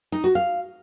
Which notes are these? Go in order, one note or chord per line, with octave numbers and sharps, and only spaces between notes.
D#4
F#4
F5